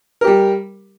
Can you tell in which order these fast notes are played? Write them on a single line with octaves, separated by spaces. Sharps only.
A#4 G4 G3